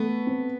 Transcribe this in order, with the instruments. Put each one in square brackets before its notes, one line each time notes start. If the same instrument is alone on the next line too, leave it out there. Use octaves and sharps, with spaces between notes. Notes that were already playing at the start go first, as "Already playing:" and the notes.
Already playing: [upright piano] A3 [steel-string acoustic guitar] B3
[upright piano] C4